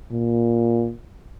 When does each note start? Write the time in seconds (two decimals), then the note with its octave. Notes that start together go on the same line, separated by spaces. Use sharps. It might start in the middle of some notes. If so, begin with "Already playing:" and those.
0.12 A#2